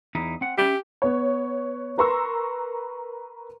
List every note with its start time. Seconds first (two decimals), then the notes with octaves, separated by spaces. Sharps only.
0.15 E2 D#4 E4
0.41 C4 F#5
0.58 C#4 G4 E5
1.02 B3 C#5
1.98 A#4 B4 A#5 C6 C#6 E6